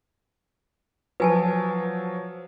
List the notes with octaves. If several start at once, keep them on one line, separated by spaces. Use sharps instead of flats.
F3 F#3 B4 G#5 A5